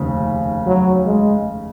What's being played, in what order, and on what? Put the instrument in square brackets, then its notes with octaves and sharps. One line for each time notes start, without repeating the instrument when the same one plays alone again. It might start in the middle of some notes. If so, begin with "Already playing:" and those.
Already playing: [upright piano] F1 D#2 C#3
[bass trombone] F#3
G#3